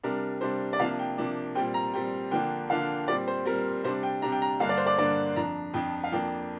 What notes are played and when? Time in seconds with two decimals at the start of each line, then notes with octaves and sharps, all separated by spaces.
0.03 C3 G3 D4 A#4
0.41 C3 G3 D4 C5
0.73 D5
0.79 C3 F3 A#3 D4 F5
0.99 G5
1.18 C3 F3 A#3 D4
1.55 A#2 G3 C4 G5
1.74 A#5
1.94 A#2 G3 C4 G5
2.31 D3 F3 A#3 D4 G5
2.70 D3 F3 A#3 D4 F5
3.08 A#2 G3 C4 D5
3.28 C5
3.45 A#2 G3 C4 A#4
3.84 C3 G3 D4 C5
4.03 G5
4.22 C3 G3 D4 A#5
4.32 G5
4.42 A#5
4.60 G2 D3 A#3 D4 F5
4.69 D5
4.77 C5
4.86 D5
4.98 G2 D3 A#3 D4 D5
5.36 F2 F3 D4 A#5
5.74 F2 F3 D4 G5
6.04 F5
6.12 F2 F3 A#3 D4 G5